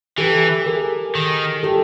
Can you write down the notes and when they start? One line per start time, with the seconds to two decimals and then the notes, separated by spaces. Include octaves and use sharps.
0.18 E3 G4 A4
0.66 G#4 A#4
1.15 D#3
1.63 G4 A4